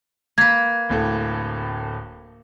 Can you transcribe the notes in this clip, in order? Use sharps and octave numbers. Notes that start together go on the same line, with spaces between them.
A#3 B4 G#6
D1 A2 A4